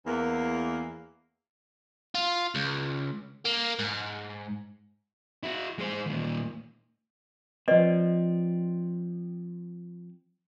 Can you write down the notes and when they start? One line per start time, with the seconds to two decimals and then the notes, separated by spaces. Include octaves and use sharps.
0.07 E2 A#3
2.15 F4
2.55 C#2
3.45 A#3
3.79 G#2
5.43 E4 F#4
5.78 G#3 C5
6.06 D#2 A#2
7.68 F3 C4 B4 D5 D#5